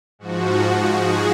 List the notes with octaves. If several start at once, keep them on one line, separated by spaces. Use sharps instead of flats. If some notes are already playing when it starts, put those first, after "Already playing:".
G#2 F3 F#4
G#4